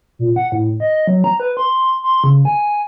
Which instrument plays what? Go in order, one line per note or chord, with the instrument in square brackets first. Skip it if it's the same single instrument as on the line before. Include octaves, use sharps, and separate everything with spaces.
[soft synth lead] A#2
F#5
A2
D#5
F#3
A#5
B4
C6
C6
C#3
G#5